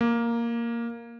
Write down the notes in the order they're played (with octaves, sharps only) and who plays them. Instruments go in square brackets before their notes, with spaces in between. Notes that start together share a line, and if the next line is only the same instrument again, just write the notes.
[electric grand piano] A#3